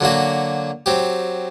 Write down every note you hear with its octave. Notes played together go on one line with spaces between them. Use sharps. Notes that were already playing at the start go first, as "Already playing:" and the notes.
D3 F#3 A#3 F#4
F#3 C4 G4